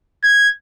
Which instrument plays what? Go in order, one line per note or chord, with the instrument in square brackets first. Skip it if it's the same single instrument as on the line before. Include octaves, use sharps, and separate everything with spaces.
[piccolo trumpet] G#6